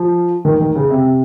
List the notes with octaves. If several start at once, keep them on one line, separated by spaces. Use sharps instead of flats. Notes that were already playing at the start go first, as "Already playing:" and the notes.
Already playing: F3
D#3
D#3
C#3
C3
C3